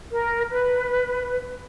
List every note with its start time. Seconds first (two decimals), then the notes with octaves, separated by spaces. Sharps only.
0.11 A#4
0.51 B4